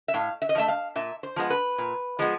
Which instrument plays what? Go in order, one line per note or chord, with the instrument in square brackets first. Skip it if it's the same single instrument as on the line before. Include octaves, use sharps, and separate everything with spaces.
[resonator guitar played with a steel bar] E5
A2 F5
E5
D#5
F3
A3 E5
F5
A#2 E5
C5
F3 G#3 B3
B4
A#2
F3 G#3 B3